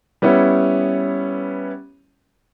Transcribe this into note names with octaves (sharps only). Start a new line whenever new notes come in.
G3 B3 C#4 E4 C#5